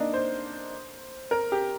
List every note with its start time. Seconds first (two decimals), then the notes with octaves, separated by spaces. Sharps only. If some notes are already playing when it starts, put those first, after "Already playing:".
Already playing: A#3 D4 D#4
0.14 C5
1.31 A#4
1.52 G4